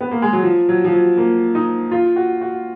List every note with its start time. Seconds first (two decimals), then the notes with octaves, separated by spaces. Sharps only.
0.01 B3
0.11 A#3
0.22 G#3
0.33 F#3
0.43 F3
0.69 F#3
0.84 F3
0.93 F#3
1.17 A#3
1.55 D#4
1.91 F4
2.16 F#4
2.41 F#4